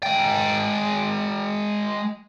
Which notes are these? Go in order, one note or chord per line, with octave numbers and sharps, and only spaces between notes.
G#3 G5